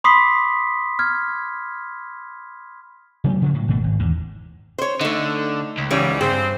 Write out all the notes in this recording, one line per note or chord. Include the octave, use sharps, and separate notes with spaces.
B5 C6 D6 D#6 B6 C7
F6 G#6
C3 F#3 G#3 A3
C#3 F3 G3 A#3
A2 F#3
G#1 B2 A3
G#1
E2 G#2
C5 C#5
D3 A3 D#4
C#2
G#2 C#3 E3 G3 C#5
G2 C4 G#4